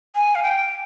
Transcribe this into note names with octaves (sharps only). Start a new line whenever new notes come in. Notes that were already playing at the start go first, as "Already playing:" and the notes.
G#5
F5
G5